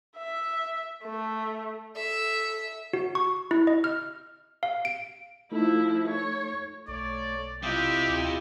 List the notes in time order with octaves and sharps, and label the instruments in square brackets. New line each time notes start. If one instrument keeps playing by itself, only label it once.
[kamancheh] E5
A3
[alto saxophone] A4 [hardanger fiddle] E5
[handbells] F#4
C#6
E4
D#5
F6
F5
D7
[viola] F3 E4 [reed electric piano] A3 D#4 A4
[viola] C#5
[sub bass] B1 [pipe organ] A3 C#5 [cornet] D5
[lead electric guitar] C3 [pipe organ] E4 F4 D#5 [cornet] G4
[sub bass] D2